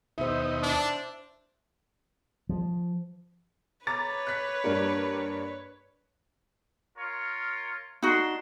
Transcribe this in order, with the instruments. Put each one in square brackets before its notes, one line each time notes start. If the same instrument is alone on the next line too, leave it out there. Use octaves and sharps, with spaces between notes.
[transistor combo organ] D#2 B2 D#4 [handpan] C5 E5
[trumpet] D4
[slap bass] F3
[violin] B4 C#5 [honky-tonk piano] A#5 D6 A6
[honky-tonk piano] F#6 B6
G2 G3 A#3
[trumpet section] F4 A#4 C#5
[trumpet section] D4 C6 [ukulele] D#4 F#4